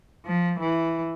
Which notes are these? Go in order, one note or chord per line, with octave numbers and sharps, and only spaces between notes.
F3
E3